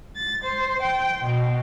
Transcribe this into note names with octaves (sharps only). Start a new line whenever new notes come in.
A6
C5
G5
B2